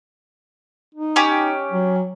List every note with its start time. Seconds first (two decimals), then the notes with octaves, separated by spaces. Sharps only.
0.95 D#4
1.16 C#4 G4
1.71 F#3